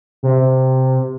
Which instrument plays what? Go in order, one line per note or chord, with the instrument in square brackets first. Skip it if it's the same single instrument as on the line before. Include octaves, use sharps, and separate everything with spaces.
[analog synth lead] C3